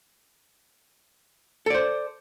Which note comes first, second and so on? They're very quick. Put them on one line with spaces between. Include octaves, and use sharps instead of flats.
A4 D5 C5